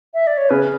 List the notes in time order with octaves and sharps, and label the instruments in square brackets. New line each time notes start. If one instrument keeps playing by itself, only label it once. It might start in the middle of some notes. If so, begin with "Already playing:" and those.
[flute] E5
D5
C#5
[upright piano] C#3 [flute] B4